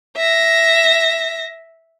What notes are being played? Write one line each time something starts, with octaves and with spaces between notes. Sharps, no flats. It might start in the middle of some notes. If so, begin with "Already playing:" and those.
E5 A#6